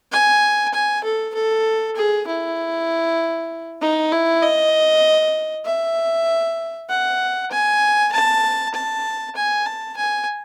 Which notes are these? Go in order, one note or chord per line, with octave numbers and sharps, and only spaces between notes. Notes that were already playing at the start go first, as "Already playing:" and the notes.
G#5
G#5
A4
A4
G#4
E4
D#4
E4
D#5
E5
F#5
G#5
A5
A5
G#5
A5
G#5